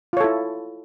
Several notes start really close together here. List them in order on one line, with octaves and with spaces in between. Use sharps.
F4 C#5 A4 E4